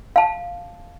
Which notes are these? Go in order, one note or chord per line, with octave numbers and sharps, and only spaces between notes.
F5 A5